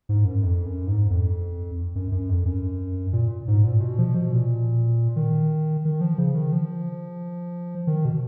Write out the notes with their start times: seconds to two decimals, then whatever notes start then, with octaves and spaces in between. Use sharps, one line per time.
0.09 G#2
0.25 F#2
0.43 F2
0.65 F#2
0.87 G#2
1.10 F2
1.95 F#2
2.12 F#2
2.29 F2
2.46 F#2
3.13 A#2
3.48 G#2
3.64 A#2
3.81 B2
3.99 F3
4.14 B2
4.32 A#2
5.16 D#3
5.85 D#3
6.01 F3
6.18 C#3
6.35 D#3
6.53 F3
7.87 D#3
8.05 B2